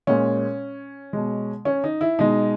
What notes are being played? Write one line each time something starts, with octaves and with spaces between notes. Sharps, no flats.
A#2 G#3 C#4
B2 G#3
C#4
D#4
E4
B2 G#3 D#4